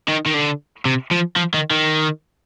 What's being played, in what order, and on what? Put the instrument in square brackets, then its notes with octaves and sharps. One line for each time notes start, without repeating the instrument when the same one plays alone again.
[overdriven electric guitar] D#3
D#3
D3
C3
F3
F3
D#3
D#3